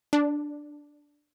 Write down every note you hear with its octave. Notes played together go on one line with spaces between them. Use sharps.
D4